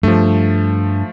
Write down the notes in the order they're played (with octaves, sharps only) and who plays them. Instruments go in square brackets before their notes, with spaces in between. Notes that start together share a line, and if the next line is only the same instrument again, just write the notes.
[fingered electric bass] G2 [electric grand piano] F3 A3